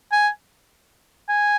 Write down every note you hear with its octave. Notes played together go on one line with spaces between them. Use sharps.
G#5
G#5